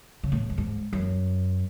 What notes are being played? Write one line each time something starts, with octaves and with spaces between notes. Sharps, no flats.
C#3
A2
F#2
G#2
F#2